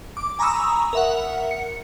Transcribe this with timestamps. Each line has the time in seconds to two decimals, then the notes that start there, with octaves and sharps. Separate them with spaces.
0.17 D6
0.39 G#5 A#5 B5 C#6 D#6 E6
0.93 A#4 E5 F#5
1.51 C#7